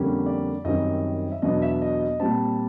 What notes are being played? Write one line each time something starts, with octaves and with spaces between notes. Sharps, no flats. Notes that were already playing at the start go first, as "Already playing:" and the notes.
Already playing: F2 D3 G3 A#3 C#4
D5
F#2 D#3 G3 C4 D#5
E5
E2 B2 F#3 B3 D4 D#5
E5
D#5
D#5
A#2 G3 C4 A5